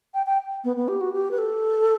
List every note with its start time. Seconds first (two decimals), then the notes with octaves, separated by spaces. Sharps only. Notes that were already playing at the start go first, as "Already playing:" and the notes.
0.14 G5
0.27 G5
0.64 B3
0.76 B3
0.88 G4
1.01 F#4
1.14 G4
1.31 B4
1.38 A4